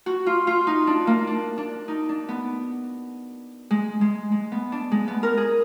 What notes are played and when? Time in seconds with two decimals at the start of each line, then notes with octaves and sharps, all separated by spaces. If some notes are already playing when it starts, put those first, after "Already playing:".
0.06 F#4
0.26 F4
0.47 F4
0.67 D#4
0.87 D4
1.07 A#3
1.27 D4
1.58 D4
1.88 D#4
2.09 D4
2.29 B3
3.71 G#3
4.01 G#3
4.32 G#3
4.52 B3
4.72 D4
4.92 G#3
5.08 B3
5.23 A#4
5.37 G#4